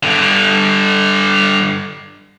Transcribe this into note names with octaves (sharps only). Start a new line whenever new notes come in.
G2 D3